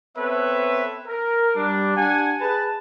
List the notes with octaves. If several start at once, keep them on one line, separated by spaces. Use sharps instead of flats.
B3 C4 A4 B4 C#5 E5
A#4
G3 D4
D4 G4 F#5 G#5
G#4 B4 A5